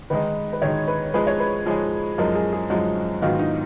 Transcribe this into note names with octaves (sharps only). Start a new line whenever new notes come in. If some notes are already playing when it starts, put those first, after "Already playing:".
D#3 G#3 D#4 B4
B4
D#3 G#3 D#4 C#5
B4
F3 G#3 D#4 G#4 B4
C#5
B4
F3 G#3 D#4 G#4
F#2 F3 G#3 D#4 A#4
G#4
G#4
F#2 F3 G#3 D#4 F#4
G#2 D#3 F#3 B3 F4 F#4
D#4